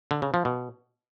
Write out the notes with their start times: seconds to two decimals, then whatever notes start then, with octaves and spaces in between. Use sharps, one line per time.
0.11 D3
0.22 C#3
0.34 F3
0.45 B2